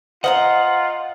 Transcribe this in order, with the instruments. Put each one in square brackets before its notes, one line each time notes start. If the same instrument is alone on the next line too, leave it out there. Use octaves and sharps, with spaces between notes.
[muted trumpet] F4 [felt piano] C5 [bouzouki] D#5 F5 A#5 [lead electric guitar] F#5